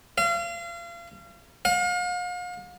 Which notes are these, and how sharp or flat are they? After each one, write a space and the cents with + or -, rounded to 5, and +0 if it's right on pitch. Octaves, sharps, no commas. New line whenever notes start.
F5 -35
F5 +40